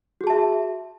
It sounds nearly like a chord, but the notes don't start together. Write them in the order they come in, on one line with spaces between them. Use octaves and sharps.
F#4 G#4 A5 E5